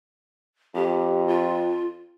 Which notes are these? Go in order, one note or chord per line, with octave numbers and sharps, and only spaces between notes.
F2 G4
F4